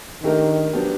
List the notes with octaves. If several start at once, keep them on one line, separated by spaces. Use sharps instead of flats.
D#3 A3 D4 G4 A#4
F#3 B3 D4 G4